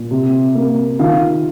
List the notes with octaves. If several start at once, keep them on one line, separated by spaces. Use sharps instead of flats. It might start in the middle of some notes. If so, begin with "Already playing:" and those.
Already playing: A#2
C3
A#3
D#3 F4 F5